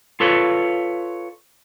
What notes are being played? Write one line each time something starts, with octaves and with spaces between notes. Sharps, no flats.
F4 A4 B4 C#5